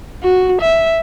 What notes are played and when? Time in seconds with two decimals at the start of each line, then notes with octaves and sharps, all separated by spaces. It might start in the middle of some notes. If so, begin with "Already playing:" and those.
0.23 F#4
0.61 E5